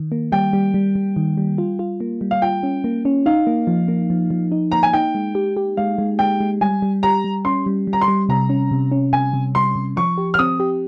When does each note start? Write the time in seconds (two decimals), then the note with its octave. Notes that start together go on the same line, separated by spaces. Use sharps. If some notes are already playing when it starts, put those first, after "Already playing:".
Already playing: D#3
0.12 A#3
0.32 G3 G5
0.53 G3
0.74 G3
0.95 G3
1.16 D#3
1.37 G3
1.58 F4
1.79 F4
2.00 A#3
2.21 G3
2.31 F5
2.42 F4 G5
2.63 C#4
2.84 A#3
3.05 C#4
3.26 D#4 F5
3.47 A#3
3.67 F3
3.88 A#3
4.10 F3
4.31 F3
4.52 D#4
4.72 A#3 A#5
4.83 G#5
4.93 D#4 G5
5.15 G#3
5.35 G4
5.57 G4
5.77 G#3 F5
5.98 G#3
6.19 G#3 G5
6.40 G#3
6.61 G3 G#5
6.82 G3
7.03 G4 A#5
7.24 G3
7.45 C#4 C6
7.66 G3
7.87 G3
7.93 A#5
8.01 C6
8.08 G3
8.29 C3 A#5
8.49 C#4
8.71 C3
8.92 C#4
9.13 C3 G#5
9.34 C3
9.55 G3 C6
9.76 C3
9.96 F3 C#6
10.18 G4
10.34 F6
10.39 C4 D#6
10.60 G4